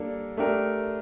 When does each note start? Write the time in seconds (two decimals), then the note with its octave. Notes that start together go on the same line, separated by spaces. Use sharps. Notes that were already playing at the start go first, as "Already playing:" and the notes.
Already playing: G3 A#3 D4 A4
0.37 A3 D4 G4 A#4